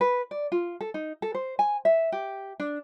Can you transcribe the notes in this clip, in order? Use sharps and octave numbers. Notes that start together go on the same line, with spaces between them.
B4
D5
F4
A4
D#4
A4
C5
G#5
E5
G4
D4